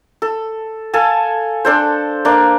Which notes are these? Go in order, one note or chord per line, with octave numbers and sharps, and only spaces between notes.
A4
A4 F5 G#5 A5
D4 A4 C5
A#3 D4